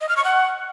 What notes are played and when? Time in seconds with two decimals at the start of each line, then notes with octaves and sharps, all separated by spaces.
0.01 D#5
0.09 F6
0.17 C#6
0.24 F#5